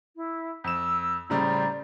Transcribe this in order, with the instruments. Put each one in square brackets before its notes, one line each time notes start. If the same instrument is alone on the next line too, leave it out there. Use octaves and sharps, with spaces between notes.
[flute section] E4
[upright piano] F2 E7 [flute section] E6
[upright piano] A2 C#3 G3 [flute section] C5 D5 A#5